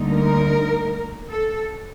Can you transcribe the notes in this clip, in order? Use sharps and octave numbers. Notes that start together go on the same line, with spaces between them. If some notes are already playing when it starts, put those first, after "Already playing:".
Already playing: D2 D3 G3 A#3 D#4
A#4
A4